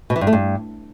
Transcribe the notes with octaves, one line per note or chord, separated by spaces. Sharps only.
B2
E3
G2
A3
G2